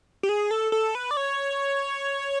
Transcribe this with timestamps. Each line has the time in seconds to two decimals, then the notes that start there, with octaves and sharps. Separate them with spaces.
0.23 G4
0.29 G#4
0.51 A4
0.72 A4
0.95 B4
1.11 D5
1.17 C#5